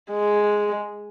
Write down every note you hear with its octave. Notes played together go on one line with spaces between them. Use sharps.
G#3